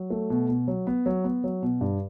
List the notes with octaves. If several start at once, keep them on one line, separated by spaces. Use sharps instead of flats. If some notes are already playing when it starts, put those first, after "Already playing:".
Already playing: F#3
A3
B2
B2
F#3
B3
F#3
B3
F#3
B2
G2